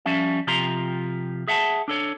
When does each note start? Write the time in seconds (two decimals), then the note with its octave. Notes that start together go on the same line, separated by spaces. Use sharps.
0.06 F3 G3 C#4 E5
0.47 C3 F3 F4 G4 A#5 C6
1.48 G#4 E5 F#5 G#5 A5
1.88 D4 A4 C#5